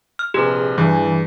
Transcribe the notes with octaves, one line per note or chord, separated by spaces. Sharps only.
F6
A#1 C3 G4 G#4 B4
G2 E3